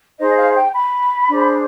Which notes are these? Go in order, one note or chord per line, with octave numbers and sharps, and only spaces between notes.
D#4 G#4 C5 D#5
F5
G5
B5
D4 G#4 C5